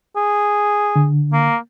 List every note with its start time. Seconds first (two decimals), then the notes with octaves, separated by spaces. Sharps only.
0.16 G#4
0.96 D3
1.33 A#3